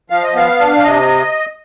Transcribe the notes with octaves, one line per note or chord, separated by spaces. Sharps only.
F3 F5
D#5
B3 F5
D4
C3 D#5